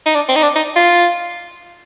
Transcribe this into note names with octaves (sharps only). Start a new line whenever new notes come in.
D#4
D4
C4
D#4
D4
D#4
F4